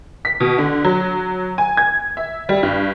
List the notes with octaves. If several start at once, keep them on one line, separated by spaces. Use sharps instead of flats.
B6
B2
D3
F#3
G#5
G#6
E5
G3
G2